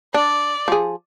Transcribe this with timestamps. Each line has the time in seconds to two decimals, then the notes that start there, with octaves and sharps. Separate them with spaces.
0.14 D4 D5
0.68 F3 G#4